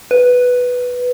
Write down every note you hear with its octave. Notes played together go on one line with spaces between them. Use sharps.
B4